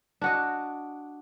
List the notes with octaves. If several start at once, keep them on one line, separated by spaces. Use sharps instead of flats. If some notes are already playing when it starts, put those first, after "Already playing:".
D4 F#4 D#5